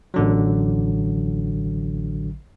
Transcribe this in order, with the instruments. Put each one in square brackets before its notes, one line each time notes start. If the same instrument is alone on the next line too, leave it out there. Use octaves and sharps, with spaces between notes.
[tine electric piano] A1 D3 F#3